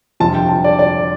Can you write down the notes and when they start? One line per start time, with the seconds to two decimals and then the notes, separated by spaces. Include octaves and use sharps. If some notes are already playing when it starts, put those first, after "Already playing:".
0.20 G1 F2 C3 F3 A5
0.34 G5
0.49 A5
0.64 D5
0.79 D5